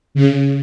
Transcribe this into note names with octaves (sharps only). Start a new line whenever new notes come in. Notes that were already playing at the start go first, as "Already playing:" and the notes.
C#3